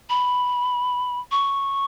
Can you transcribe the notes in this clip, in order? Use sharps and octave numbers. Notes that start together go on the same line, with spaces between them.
B5
C#6